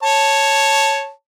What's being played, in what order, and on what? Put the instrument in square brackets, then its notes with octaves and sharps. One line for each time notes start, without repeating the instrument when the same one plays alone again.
[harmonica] C#5 A5